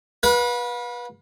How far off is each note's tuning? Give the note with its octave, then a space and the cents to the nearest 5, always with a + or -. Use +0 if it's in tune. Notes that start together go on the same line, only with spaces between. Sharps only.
B4 -25 F5 +45